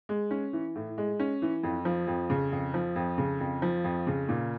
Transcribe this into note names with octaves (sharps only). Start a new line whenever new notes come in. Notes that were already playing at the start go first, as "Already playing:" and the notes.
G#3
C#4
E3
A2
G#3
C#4
E3
F2
F3
F2
C#3
F2
F3
F2
C#3
F2
F3
F2
C#3
A#2